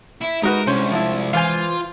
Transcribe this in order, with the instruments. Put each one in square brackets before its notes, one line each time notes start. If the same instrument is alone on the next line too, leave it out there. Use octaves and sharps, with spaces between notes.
[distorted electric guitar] E4
[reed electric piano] G#3 [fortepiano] D#4 F#4 B4 [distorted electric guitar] A#4
[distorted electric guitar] C2 [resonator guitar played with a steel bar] C#4 [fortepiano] C5 C#5
[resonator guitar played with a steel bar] F3 E4
[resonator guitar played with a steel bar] E3 C5 [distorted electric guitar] F4 [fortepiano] F5 G#5